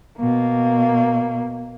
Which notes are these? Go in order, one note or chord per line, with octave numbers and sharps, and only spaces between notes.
B2 A#3